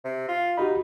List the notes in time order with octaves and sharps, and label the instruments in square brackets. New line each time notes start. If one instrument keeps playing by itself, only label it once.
[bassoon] C3
F4
[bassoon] D#4 [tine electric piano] F#4 G4 B5